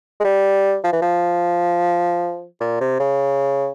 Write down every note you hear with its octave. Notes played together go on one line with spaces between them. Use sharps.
G#3
G3
F3
E3
F3
A#2
C3
C#3